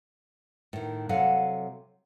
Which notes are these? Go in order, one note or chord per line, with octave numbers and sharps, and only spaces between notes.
A2 D#3
C3 F#3 A4 F5 F#5